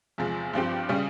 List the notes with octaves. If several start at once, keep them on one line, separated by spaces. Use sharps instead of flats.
E2 C3 F3 G#3
G2 F3 C4 G4
C#3 G3 C#4